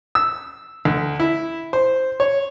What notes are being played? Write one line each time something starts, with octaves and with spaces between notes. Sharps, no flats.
E6
D2
E4
C5
C#5